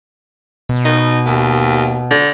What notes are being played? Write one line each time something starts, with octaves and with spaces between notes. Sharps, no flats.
B2
D#4
D#2
D3